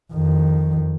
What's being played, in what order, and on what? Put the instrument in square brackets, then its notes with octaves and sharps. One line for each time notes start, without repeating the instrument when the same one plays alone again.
[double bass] F2 D#3